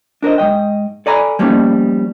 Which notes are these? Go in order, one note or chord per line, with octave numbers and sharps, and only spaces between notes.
D4 A#4 C5 D#5
G#2 E3 D#5 G5
A4 D5 G#5 A#5 B5
F3 G3 A#3 B3 C#4 D#4